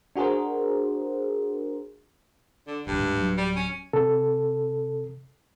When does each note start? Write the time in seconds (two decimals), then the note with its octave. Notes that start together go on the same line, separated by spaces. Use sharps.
0.16 D4 F#4 G#4 A#4 C5
2.67 D3
2.87 F1 D2 G2
2.99 D1 G#2
3.17 D1 F#3
3.37 G3
3.56 C#4
3.93 C3 A4